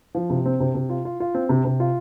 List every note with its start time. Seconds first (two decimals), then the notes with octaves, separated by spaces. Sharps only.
0.15 F3
0.30 C3
0.45 C4
0.60 C3
0.74 C3
0.90 F4
1.05 F4
1.20 F4
1.35 C4
1.49 C3
1.65 C3
1.80 F4